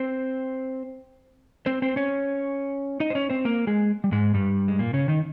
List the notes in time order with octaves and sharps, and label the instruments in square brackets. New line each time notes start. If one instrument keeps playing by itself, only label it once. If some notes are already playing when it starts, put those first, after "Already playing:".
Already playing: [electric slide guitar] C4 C5
C4 C5
C4 C5
C#4 C#5
D#4 D#5
C5
C#4 C#5
C4 C5
A#3 A#4
G#3 G#4
G3
G#2 G#3
G2 G3
G#3
A#2 A#3
C#3 C#4
D#3 D#4